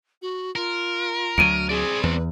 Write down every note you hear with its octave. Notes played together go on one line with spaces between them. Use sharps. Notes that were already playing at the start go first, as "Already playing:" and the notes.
F#4
F4 A#4
D2 F#3 D7 D#7
C4 G#4 D5
E2 B4